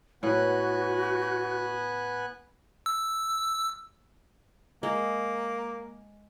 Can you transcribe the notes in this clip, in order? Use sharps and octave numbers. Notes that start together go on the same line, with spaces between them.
A2 B3 F#4 B4 G#5 F#6
E6
G#3 A#3